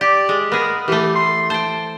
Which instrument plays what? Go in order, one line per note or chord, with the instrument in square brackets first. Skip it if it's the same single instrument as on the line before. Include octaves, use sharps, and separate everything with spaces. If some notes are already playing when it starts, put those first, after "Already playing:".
[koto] G4 [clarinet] D5
[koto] G#3
[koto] B3 G#4 [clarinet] A#4
[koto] E3 A3 [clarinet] G4
[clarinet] C6
[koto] C5 G5 [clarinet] A5